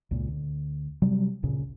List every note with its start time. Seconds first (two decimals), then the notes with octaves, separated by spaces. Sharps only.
0.11 C#2 A#2
0.28 D2
1.02 C3 F#3 G3
1.43 A1 D2 A#2 C#3